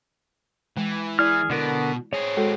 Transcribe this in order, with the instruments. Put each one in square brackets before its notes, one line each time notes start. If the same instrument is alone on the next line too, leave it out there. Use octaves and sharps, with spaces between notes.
[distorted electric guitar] E3 [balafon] G#3
[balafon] E4 D5 [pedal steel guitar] G#4 F6
[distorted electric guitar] B2 [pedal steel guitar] D3 B3 A#4
[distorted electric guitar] C4 G#4 [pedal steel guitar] C#5
[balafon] G#3 F#4 A4